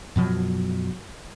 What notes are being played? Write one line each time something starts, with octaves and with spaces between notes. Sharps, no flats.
F#2 B2 F3 F#3